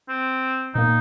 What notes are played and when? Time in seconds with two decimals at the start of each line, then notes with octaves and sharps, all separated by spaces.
0.09 C4
0.75 A#2 A#3 D#4